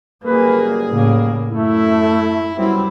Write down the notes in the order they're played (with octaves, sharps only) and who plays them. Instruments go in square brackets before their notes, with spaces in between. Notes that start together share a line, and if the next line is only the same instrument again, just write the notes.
[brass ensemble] F#1 G3 G#4 [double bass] A#3 [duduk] B4
[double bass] A2 C#3 [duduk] A#3
[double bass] F#2 [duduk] A3 [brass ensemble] E4
[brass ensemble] F#2 B3 C4 [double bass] G3 E4